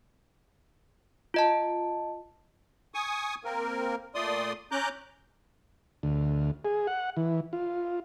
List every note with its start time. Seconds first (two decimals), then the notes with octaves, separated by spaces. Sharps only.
1.34 F4 D#5 A5
2.94 G#5 C#6 D#6
3.44 A#3 C4 A#4
4.15 A#2 A3 D5 C6 D#6
4.71 C#4 A#5 D6 F#6 G6
6.03 D2
6.65 G#4
6.87 F#5
7.17 E3
7.53 F4